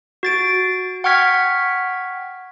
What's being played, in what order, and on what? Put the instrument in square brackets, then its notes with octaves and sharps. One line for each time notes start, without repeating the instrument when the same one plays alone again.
[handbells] F#4 A6 D7
F#5 G5 C#6 F6 G#6 B6